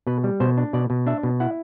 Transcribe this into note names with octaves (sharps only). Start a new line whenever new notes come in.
B2 B4
G3
B2 C5
D4
B2 D5
B2
D4 E5
B2
E4 F#5